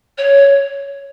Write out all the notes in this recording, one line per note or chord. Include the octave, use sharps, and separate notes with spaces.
C#5